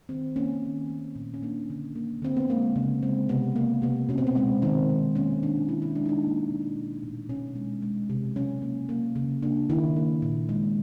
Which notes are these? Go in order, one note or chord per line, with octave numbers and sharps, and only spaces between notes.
D#3 C4
A#3 C#4
D#3
A3
A#2
C#4
A#3 D4
D3
A#3
D3 C4
B3
G#3 A#3
C#3
G#3 C4
C3 B3
A#3
C3 B3
B2 C#4
C4
B3
G#3 C4
D#3 C4
G#3
A#3 C#4
D#3 D4
D#3 E4
E4
G#3 D4
D#4
D4
A#3
B2
A3
A#2
B2 C#4
G#3
G#3
C3
F#3 C#4
A#3
A#3
C#3
A#3 D4
D#3 E4
A#3
A#2
G#3